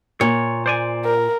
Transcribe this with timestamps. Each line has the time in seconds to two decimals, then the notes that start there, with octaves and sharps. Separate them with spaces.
0.21 A#2 C#5
0.66 C5 D5 G#5
1.05 A#4